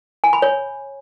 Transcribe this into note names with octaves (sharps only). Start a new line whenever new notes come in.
G#5
B5
C#5